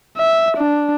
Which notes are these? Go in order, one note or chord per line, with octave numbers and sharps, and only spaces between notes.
E5
D4